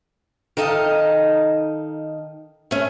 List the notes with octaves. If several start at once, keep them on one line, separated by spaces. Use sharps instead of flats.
D#3 D#4 A4 D#5 F5
A3 C#4